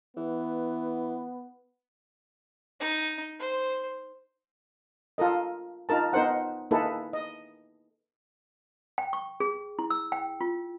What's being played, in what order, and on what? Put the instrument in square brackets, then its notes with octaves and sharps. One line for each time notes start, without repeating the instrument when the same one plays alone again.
[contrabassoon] E3 [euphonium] B3
[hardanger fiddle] D#4
C5
[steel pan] F4 A4 A#4 D#5
D#4 F4 A#4 A5
B3 D#4 A#4 C5 F#5
A#3 D#4 E4 G#4 A4 B4
D#5
[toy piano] G5
C#6
G#4
E4
E6
G5
F4